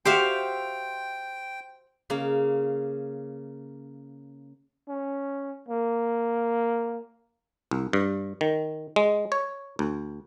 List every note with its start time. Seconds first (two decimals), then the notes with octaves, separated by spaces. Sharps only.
0.05 F#4 G4 C5 E5 F5 G5
2.10 C#3 A#3
4.89 C#4
5.69 A#3
7.71 C2
7.93 G2
8.41 D#3
8.96 G#3
9.32 C#5
9.79 D2